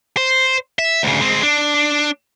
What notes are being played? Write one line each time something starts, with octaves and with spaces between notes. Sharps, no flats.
C5
E5
D2 C#3
G#3 C4
D4